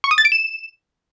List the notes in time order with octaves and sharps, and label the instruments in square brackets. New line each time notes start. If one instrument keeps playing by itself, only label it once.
[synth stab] C#6
D#6
A6
D7
E7